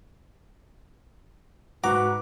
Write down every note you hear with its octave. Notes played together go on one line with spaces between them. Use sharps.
G#2 F#4 B4 F#5 A#5 D6